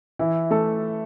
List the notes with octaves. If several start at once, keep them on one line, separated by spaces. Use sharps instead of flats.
E3 E4
A3 A4